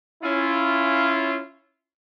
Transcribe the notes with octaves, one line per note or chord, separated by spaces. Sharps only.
C#4 E4 F4